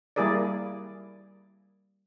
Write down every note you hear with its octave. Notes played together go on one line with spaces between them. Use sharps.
G3 A#3 E4 G#4 A#4 D5